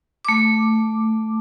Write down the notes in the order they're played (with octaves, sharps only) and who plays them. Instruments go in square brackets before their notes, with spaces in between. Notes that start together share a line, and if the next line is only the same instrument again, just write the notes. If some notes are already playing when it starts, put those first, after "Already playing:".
[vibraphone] A3 D6